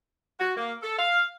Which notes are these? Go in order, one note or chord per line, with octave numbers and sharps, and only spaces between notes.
F#4
A#3
A4
F5